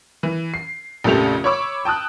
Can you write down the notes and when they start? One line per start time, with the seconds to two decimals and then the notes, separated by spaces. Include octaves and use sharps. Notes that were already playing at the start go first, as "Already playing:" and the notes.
0.23 E3
0.54 C7
1.04 A#1 F2 C#3 A3 G4 F7
1.44 C#5 B5 C#6 D6 E6
1.85 G5 A5 D#6 F#6